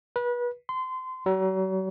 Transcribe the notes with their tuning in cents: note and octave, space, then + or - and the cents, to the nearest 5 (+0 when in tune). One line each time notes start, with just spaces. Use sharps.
B4 -30
C6 -25
F#3 +40